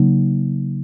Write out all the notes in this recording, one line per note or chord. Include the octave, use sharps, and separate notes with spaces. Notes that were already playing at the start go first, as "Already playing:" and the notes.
Already playing: C#3 F#3 A#3 D#4